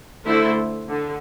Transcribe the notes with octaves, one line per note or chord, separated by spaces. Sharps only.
D3 A3 E4 A4 C5
D3